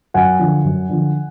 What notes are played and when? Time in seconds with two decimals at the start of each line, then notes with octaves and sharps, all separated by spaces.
0.14 F#2 F#5 G#5
0.39 D3 F3
0.64 F#2
0.89 D3 F3